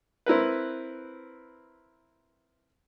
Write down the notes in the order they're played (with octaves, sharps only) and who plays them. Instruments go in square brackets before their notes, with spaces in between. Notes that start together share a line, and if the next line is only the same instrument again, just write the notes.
[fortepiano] C4 E4 A#4 B4